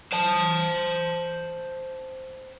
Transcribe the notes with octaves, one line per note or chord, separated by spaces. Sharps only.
C5 A5